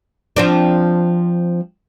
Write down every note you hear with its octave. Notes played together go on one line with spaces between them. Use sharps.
F3 C4 D4